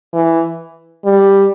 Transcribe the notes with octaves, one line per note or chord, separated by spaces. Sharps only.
E3
G3